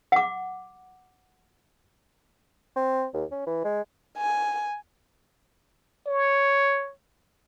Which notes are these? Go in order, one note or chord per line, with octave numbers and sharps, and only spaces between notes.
F#5 D6
C4
D#2
C#4
E3
G#3
G#5
C#5